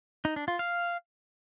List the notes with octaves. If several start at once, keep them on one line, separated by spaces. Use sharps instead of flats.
D#4
D4
F4
F5